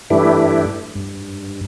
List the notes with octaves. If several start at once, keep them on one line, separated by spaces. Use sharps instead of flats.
G2 E3 A3 D4 E4 G4
G2